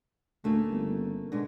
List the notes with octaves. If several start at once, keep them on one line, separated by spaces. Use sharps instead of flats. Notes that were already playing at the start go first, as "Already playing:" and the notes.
D2 C#3 A3 A#3
G1
B2 D3 G#3